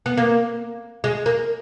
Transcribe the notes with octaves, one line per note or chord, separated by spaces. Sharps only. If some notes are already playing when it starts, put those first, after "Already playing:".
B3
A#3
G#3
A#3